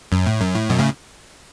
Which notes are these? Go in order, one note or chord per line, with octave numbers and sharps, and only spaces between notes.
F#2
A2
F#2
A2
F#2 B2
A2 C#3